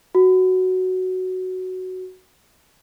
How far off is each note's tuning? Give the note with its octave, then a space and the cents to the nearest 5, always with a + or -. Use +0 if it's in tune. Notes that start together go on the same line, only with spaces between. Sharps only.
F#4 +5